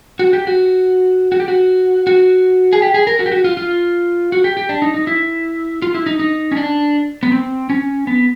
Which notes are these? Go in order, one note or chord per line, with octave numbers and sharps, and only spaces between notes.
F#4
G4
F#4
F#4
G4
F#4
F#4
G#4
G4
G#4
A#4
F#4
G4
F#4
F4
F4
F#4
G4
G4
D4
D#4
D#4
E4
F4
E4
D#4
D#4
C#4
D4
B3
C4
C#4
B3